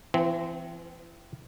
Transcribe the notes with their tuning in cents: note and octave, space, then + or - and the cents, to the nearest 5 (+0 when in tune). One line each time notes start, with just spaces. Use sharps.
E3 +35 C4 -20